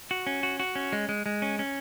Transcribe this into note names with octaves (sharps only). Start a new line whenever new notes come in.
F#4
C#4
F#4
F#4
C#4
G#3
G#3
G#3
C#4
C#4